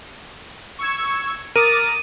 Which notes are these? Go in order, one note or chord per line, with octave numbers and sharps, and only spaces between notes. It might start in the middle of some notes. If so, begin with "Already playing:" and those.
C#6 E6 G#6
A#4 D6 D#6 A6 D#7